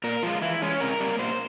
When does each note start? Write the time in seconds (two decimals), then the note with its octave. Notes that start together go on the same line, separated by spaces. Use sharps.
0.04 A#2 A#4
0.23 F3 G#3 F4
0.42 E3 E4
0.62 G#3 C#4
0.81 C3 A#4
1.00 G3 A#3
1.19 A#2 C5